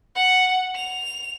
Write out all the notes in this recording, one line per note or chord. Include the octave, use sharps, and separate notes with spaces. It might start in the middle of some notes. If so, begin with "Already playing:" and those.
F#5
F7